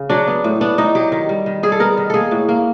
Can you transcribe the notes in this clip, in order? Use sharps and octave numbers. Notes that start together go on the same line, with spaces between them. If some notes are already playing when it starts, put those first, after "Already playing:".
Already playing: C#3
F#3 D4
B3
A2
B3 D4
A2 D#4
F#3 G4
D#3
G3
D#3
G3 G#4
A4
B3 A#4
D#3
A#3 G#4 A4
A2
A#3